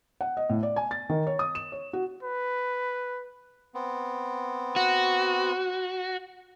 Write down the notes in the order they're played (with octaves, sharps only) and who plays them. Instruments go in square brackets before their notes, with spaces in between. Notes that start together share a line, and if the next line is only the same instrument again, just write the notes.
[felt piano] F#5
D#5
A2
D5
G#5
A6
D#3
C#5
D#6
E7
C#5
F#4
[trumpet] B4
[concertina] B3 C4
[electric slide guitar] F#4